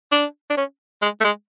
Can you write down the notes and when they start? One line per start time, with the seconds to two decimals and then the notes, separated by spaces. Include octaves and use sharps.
0.12 D4
0.50 D4
0.57 C#4
1.02 G#3
1.20 A3
1.24 G#3